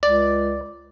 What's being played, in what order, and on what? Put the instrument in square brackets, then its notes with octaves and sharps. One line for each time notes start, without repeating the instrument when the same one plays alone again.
[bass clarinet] C#2 [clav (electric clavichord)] D5